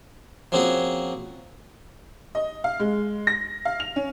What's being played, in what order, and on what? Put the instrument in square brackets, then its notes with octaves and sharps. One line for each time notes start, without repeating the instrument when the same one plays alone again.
[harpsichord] F3 A#3 C4 C#4 F#4 G#4
[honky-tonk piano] D#5
F5
G#3
A#6
F5
F7
C#4